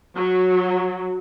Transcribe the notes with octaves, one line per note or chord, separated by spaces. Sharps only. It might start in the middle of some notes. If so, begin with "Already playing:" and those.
F#3